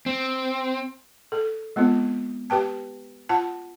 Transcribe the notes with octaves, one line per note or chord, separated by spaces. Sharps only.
C4
A4
G#3 B3 C4 F4
G4 B4 G5 A5
F4 F#5 A5